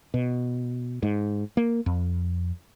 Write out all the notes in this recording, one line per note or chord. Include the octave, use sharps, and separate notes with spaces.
B2
G#2
A#3
F2